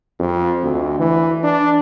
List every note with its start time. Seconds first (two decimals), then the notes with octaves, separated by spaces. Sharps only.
0.20 F2
0.63 D2
0.99 E3
1.43 D4